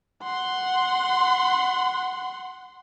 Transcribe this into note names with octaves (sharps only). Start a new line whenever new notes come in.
F#5 C6